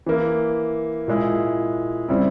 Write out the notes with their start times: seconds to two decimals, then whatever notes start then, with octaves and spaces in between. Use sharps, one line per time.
0.06 E3 A#3 E4
1.08 A#2 G#3 E4
2.09 C#3 G3 C4 E4